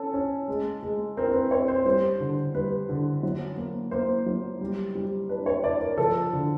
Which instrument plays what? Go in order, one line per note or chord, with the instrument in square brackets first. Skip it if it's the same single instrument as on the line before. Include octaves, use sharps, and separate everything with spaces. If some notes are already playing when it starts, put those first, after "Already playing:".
Already playing: [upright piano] C#4 A4
C#4
G#3
G#3
C4 A#4
B4
C4 C#5
C5
G3 C5
D3
G3 B4
D3
F#3
A#3
A#3 C5
F#3
G3
G3
D4 B4
C#5
D4 D5
A#4
F3 A4
D3